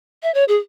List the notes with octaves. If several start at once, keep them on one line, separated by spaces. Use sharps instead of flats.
E5
C#5
G#4